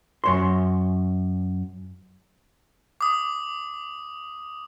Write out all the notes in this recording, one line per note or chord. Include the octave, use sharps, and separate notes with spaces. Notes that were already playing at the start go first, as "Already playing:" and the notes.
F#2 C#5 C6
D6 D#6